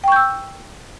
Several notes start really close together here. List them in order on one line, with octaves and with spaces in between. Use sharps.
G5 C#6 G6 E6